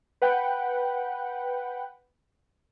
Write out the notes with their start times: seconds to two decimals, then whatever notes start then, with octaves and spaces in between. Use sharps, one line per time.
0.22 B4 F#5 G5